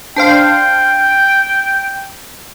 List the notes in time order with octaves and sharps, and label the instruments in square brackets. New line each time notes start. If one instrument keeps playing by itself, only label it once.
[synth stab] D4 C5 F5 [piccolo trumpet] G5